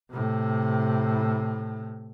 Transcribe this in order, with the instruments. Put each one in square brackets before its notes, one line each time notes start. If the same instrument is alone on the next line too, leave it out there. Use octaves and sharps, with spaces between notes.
[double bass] A2 C3